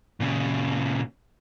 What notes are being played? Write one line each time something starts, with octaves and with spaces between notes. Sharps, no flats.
A#2 C#3